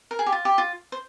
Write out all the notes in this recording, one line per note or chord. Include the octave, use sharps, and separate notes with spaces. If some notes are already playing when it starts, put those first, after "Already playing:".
A#4
G#4
G4
F4
G4
F4
C5